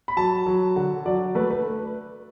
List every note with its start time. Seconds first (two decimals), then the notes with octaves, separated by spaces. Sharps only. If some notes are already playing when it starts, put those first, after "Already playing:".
0.08 B5
0.17 F#3 A5
0.46 F#3
0.76 D3 F#5
1.06 F#3 D5
1.35 A3 B4
1.51 B4